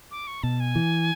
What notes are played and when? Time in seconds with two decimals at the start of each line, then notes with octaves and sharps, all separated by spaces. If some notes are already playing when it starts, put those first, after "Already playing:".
0.11 D6
0.27 C#6
0.43 B2 A5
0.60 G#5
0.76 E3